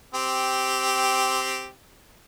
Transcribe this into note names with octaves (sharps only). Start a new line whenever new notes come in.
C4 G4